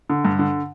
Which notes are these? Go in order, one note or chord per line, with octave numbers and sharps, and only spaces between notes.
D3
G2
D3